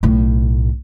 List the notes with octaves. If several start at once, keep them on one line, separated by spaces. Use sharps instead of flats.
B1 A2